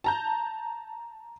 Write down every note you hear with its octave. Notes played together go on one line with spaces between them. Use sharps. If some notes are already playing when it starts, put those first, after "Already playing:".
A5 A#5 G6